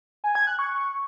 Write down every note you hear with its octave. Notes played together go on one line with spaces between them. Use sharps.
G#5
G#6
F#6
C#6